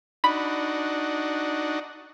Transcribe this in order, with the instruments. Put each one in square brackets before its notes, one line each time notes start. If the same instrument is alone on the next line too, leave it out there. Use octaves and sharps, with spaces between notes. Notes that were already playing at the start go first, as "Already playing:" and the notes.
[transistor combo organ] D4 D#4 F#4 [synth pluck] B5